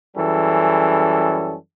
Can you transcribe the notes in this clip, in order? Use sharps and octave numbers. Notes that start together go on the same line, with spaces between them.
F#2 E3 G3 C#4 G#4 A4